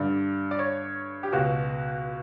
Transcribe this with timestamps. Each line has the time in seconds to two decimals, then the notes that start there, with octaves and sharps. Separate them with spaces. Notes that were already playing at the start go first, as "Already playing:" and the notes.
Already playing: G2 D3 D5
0.51 D5
0.59 C#5
1.23 G4
1.32 C#2 B2 F#4